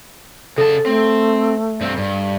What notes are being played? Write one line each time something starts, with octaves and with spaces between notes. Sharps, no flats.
C#3 A4 A5
A3 C4
G2 C4
G2